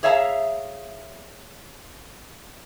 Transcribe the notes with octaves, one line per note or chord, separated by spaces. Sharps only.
G#4 C#5 E5 F5 G#5 A#5